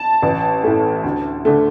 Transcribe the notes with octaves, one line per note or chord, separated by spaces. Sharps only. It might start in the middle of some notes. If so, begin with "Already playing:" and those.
Already playing: A5
A1
A2 A3
D2
D3 A3